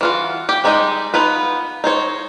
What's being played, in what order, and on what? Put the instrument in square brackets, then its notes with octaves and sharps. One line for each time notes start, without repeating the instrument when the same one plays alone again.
[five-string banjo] E3 F4 F#4
G4
G3 G#3 D#4 G4 D#5
B3 D#4 F4 B4
D#4 C5 C#5